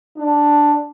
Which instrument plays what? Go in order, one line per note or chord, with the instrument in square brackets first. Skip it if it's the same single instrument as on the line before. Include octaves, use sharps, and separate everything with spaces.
[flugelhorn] D4